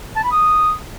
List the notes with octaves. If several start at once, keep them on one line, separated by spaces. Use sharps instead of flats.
A5
B5
D#6